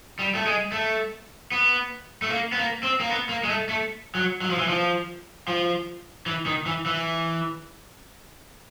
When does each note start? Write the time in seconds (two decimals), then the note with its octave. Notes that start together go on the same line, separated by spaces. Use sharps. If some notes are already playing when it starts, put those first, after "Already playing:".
0.19 G3
0.34 A3
0.46 G#3
0.72 A3
1.52 B3
2.22 A3
2.30 A#3
2.52 B3
2.57 A#3
2.83 C4
3.00 A#3
3.09 B3
3.29 A#3
3.43 G#3
3.49 A3
3.69 A3
4.15 F#3
4.41 F#3
4.50 F3
4.59 E3
4.68 F3
5.47 F3
6.26 E3
6.46 D#3
6.66 E3
6.86 E3